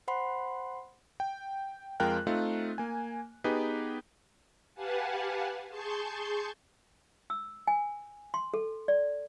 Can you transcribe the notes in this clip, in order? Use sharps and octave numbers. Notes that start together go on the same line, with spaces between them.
C5 F#5 B5 C6
G5
F2 G#3 F4 A#4 G5 F#6
A3 C4 D#4 F4
A#3 G#5
B3 D#4 G4 G#4 B4
G4 B4 F5 F#5 G#5 A5
G#4 A5 C6 C#6 G6
E6
G#5
C6
A4
D5